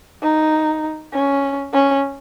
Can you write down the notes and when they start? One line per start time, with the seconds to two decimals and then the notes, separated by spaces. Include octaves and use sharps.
0.22 D#4
1.13 C#4
1.73 C#4